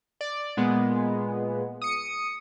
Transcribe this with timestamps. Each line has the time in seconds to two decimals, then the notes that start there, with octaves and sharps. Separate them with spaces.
0.21 D5
0.57 A#2 G#3 B3
1.82 D#6 C#7